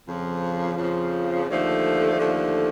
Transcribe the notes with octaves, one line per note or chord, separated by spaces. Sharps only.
F2 C#3 F3
F2 C#3 F3
D#2 D3 F3 A3
D#2 D3 F3 A3